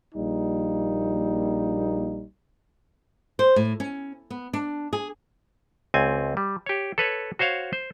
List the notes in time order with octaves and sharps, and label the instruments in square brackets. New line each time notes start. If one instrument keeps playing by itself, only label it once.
[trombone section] A#1 G3 A#3 D#4
[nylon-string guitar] C5
A2
C#4
B3
D4
G#4
[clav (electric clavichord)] C#2 C4 G#5
G3
G4 C#5
A4 B4 C#5
F#4 C5 C#5 F5
C5